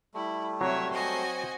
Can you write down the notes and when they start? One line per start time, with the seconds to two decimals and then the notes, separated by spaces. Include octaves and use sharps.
0.14 G3 A3 E4
0.61 C3 F#3 C#5 E5
0.92 C4 F#4 C5 D#5 G#5